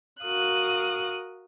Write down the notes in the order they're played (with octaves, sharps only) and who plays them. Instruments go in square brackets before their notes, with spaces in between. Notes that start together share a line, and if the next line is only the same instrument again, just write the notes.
[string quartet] F#4 A#4 F5 D#6 F#6